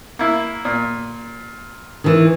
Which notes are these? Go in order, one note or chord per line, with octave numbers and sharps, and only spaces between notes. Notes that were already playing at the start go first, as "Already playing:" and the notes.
A#3 E4
A#2
D#3 E3